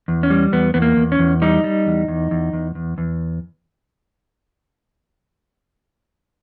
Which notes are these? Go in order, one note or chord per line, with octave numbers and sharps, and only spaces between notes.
E2
C#4
G3
E2 B3
E2 B3
A#3
E2
C#4
E2
G3 D#4
G3
E2
E2
E2
E2
E2
E2